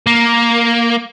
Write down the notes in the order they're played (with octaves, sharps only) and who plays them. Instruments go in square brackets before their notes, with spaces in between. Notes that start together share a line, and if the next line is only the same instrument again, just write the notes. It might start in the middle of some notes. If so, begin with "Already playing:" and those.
[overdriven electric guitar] A#3